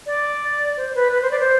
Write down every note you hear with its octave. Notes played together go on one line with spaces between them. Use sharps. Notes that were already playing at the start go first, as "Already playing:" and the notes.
D5
C5
B4
B4
C5
D5
C5